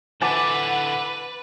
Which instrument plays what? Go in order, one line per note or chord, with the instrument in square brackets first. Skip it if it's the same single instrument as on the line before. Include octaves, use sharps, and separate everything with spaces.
[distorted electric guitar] D3 E4 [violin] B4 [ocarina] F#5 [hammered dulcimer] A5 D6